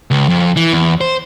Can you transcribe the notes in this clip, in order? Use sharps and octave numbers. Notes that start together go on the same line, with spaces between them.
C#2
F2
E3
E2
C5